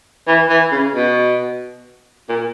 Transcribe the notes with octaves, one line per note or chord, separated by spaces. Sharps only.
E3
E3
C#3
B2
A#2